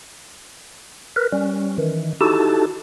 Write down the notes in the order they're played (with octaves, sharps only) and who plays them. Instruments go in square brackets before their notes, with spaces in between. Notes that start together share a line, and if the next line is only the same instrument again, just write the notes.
[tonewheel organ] A#4 B4
G3 C#4
D#3 E3
D#4 E4 F#4 G4 A4 A5